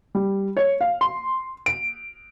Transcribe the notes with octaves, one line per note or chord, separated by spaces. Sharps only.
G3
C#5
F5
C6
D7